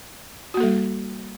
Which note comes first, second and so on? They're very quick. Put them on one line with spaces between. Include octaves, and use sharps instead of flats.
F#4 A#3 A4 G3